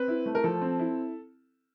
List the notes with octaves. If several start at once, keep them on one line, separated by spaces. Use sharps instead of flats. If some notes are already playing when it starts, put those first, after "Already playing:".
Already playing: C4 B4
E4
A3
A#4
F3 A4
C4
E4